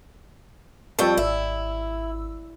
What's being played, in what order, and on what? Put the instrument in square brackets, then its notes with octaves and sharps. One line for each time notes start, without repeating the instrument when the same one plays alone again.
[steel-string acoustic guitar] F2 G3 G5 [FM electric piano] A5 C#6 E6
[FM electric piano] G#1 E6 [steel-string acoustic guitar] E4